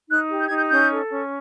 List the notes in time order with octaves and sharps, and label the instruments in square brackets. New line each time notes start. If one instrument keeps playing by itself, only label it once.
[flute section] D#4 F#6
G4
G6
D#4 G#6
G6
C#4 G6
A4
C#4